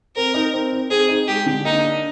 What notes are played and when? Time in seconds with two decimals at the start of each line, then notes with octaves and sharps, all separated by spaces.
0.16 C4 A#4
0.34 D#4
0.53 C4
0.73 D#4
0.90 C4 G#4
1.09 D#4
1.28 G#3 G4
1.46 D3
1.65 A#3 D#4
1.83 D4